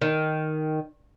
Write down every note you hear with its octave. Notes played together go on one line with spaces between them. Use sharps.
D#3